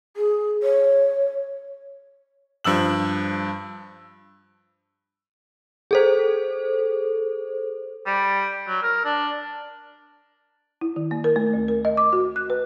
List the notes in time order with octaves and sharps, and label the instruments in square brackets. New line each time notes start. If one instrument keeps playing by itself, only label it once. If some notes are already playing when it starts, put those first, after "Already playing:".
[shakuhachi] G#4
C#5
[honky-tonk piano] G2 F3 E6 F#7
[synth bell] G#4 A4 C5
[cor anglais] G3
F#3
A#4
D4
[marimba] E4
D#3
A#3
A#4
A3
D2
A#4
D#5
D6
F#4
F#6
B4